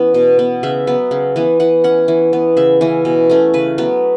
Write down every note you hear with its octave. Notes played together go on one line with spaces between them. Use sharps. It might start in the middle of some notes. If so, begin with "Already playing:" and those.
Already playing: E3 B3 C#4
B2
B3
C#3 E5
F#3 B3
C#3
E3 B3
E3 F#5
C#4 F#5
E3
B3
C#3 E5
E3 C#4
B2
A3 C#4
C#3 B4
F#3 B3